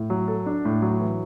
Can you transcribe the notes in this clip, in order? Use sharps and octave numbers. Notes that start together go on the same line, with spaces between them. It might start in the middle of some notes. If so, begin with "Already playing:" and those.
Already playing: A2
F#3
A4
D4
A2
F#3
E3